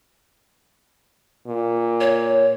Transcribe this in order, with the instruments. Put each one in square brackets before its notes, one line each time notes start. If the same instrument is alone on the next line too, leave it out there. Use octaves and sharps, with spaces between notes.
[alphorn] A#2
[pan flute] C#5